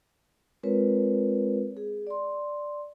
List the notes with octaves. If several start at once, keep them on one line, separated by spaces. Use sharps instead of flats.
G#3 C4 F4 A#4 B4 C#5
G#4
D5 C6